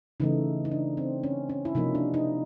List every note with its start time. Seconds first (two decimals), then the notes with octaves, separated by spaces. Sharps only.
0.20 C#3 E3 A3 D#4
0.65 D#4
0.72 D4
0.97 C4
1.23 C#4
1.49 C#4
1.65 E4
1.75 C3 F3 A#3 D#4
1.95 D4
2.14 D#4